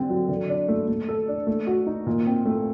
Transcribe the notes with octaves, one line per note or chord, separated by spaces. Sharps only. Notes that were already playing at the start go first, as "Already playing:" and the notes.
Already playing: D3 G3 C4
F#3
D3
D4
A3
A3
A4
D4
A3
F#4
D#4
A#2
C4
A3